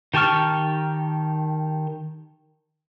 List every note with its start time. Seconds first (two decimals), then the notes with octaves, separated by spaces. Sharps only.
0.14 D#3 G4 A5 C#6 F6